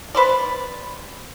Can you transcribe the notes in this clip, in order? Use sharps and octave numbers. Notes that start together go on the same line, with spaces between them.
B4 C5 D5